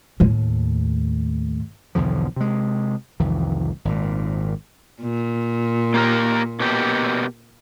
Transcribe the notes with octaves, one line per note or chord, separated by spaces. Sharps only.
D#2 A2
B1 E2 D3 F3
C3 G#3
C2 F2 D#3 E3
G#1 A#2
A#2
A#3 G4 A#4
B2 A#3 G4